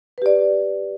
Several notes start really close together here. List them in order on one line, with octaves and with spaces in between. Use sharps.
B4 G4 D5